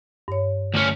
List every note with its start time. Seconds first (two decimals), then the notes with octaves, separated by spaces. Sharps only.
0.28 G2 C#5
0.74 D2 C#4